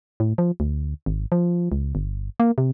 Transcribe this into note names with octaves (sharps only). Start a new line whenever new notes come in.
A2
F3
D2
G#1
F3
C#2
G1
A#3
C3